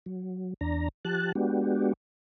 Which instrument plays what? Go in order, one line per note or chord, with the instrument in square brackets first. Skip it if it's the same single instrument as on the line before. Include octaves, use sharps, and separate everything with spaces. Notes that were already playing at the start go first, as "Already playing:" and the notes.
[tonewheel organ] F#3
E2 D4 A#5
F3 G4 A5 F#6
G#3 B3 D4 F#4 G4